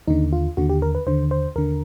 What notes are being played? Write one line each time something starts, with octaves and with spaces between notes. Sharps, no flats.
D#2 D3 D#4
F4
D#2 D3 F#4
G4
A#4
B4
D#2 D3 C5
C5
D#2 D3 A#4